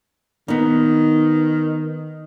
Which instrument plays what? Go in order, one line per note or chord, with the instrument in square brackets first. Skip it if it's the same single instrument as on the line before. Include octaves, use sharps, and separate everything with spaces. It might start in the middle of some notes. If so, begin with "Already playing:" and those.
[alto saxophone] D#3 [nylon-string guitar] B3 D#4